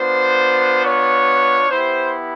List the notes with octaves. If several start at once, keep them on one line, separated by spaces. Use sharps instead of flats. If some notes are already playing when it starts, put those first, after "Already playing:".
Already playing: B3 D4 F4 C5
C#5
B3 E4 G4 C5